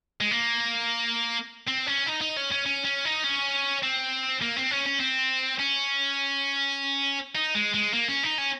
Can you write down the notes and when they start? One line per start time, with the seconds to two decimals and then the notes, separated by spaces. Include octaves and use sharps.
0.21 G#3
0.31 A#3
1.68 C4
1.87 C#4
2.07 D#4
2.21 D#4
2.37 C#4
2.52 C#4
2.66 C#4
2.85 C#4
3.05 D#4
3.24 C#4
3.83 C4
4.42 A#3
4.57 C4
4.71 C#4
4.86 C#4
5.00 C4
5.60 C#4
7.35 D#4
7.55 G#3
7.74 G#3
7.94 A#3
8.08 C#4
8.23 D#4
8.38 C#4